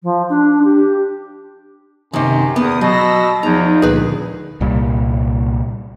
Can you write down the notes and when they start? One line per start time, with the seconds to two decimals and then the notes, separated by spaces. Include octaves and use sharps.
0.03 F3
0.29 D4
0.64 G4
2.13 F#2 C3 D#3
2.56 E2 B3 D#6
2.81 B2 F#3 E6 A#6
3.43 E2 F3 D#4 A#5
3.82 C#2 A#2 D3 G#4 B4
4.61 C2 A#2 G3